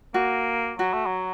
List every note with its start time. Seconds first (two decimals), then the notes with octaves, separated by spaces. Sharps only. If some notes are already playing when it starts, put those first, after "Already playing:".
0.14 A#3 F#4
0.79 F#3 F#4
0.94 A3
1.06 F#3